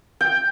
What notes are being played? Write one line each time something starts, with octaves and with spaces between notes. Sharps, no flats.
G5